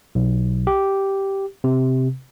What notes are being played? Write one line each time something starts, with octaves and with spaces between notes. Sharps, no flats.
B1
G4
C3